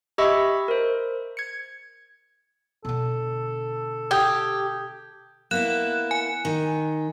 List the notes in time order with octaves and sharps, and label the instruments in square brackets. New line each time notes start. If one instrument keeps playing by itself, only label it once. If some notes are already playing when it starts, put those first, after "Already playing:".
[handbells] G4 D#5 E5 B5 C#6 E6
A#4 C5
G#6 C#7
[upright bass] B2 D3 [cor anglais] A4
[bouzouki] G4 [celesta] D#6 G6 G#6
[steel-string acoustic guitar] A#3 B3 E4 [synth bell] F#6 E7
[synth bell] G#5
[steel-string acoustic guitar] D#3